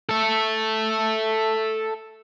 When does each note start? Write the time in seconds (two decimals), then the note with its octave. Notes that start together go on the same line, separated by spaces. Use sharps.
0.09 A4 E5